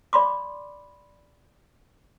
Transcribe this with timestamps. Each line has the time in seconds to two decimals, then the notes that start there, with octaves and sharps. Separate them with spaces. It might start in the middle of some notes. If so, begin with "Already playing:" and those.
0.13 D5 B5 C6 D6